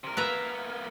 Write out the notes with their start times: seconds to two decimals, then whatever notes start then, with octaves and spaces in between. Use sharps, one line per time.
0.04 C3 A#4
0.17 A#3 B3 B4 E5 A#5